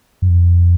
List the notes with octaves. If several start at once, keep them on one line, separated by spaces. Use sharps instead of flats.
F#2
F2